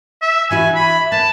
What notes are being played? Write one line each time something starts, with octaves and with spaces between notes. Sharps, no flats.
E5
E3 E4 F#4 G#5
B5
B4 A5